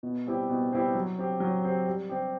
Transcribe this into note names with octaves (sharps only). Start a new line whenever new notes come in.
B2
G3 C4 E4 G4
B2
G3 C4 E4 G4
F#3
C4 G4
F#3
C4 G4
G3
C4 G4